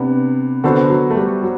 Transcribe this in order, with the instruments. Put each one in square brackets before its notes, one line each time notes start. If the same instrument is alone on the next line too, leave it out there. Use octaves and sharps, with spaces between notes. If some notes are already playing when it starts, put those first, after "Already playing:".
Already playing: [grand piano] C3 [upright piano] B3 D4
[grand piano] D3 [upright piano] B3 F#4 A4 C5
[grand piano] F#3
A3
G3
F#3